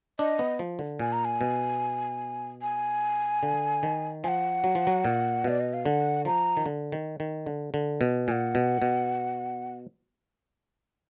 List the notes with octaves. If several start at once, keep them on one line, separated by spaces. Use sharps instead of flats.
D4 D#5
B3
F3
D3
A#2 G#5
A#5
G#5
B2
G#5
D3
D#3
F3 F#5 G#5
F#3
F3
F#3
A#2
B2 D5
D#5
F5
D3 F#5
F3 A#5
D#3
D3
D#3
D#3
D3
D3
B2
A#2 F#5 G#5
B2
B2